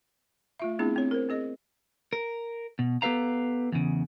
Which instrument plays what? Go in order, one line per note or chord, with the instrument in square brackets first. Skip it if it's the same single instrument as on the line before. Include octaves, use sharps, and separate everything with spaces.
[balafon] A3 F4 E5
A3 B3 C4 D4 E4 G#4
C4 C#5
A#4 C5
C4 G#4 D#5
[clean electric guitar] A#4
B2
B3 G4 A4 B4 F5 A#5
E2 C#3